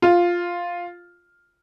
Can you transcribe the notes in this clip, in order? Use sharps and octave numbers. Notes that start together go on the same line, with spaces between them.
F4